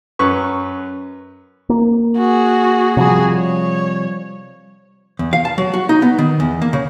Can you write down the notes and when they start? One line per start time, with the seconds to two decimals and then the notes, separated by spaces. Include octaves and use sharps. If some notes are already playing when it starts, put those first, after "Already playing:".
0.19 F#2 B4 C#6
1.69 A#3
2.18 F#4 G#4
2.97 C3 F3 G3 F#4 G#4
3.35 C#5
5.19 E2
5.33 F5
5.45 A5
5.58 F#3
5.74 F#4
5.89 D#4
6.02 B3
6.19 D#3
6.40 E2
6.62 A#3
6.73 C#3